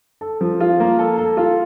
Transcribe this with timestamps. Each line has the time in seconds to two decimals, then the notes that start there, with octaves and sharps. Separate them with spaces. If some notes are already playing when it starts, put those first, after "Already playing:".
0.21 A4
0.41 F3
0.60 F4
0.80 A#3
0.99 A4
1.18 A4
1.37 F4